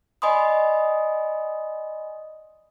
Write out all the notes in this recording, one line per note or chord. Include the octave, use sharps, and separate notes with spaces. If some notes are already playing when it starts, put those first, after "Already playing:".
D5 D#5 G#5 B5 C6 D#6